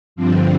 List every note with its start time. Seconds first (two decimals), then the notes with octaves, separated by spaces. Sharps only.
0.16 G2 D3 F3 C4